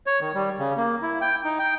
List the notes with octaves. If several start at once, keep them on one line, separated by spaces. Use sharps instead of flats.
C#5
D#3
G3
C#3
A#3
E4
G5
D#4
G5